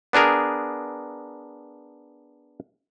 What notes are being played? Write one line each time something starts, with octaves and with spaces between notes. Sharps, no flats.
B3 D4 G#4 A#4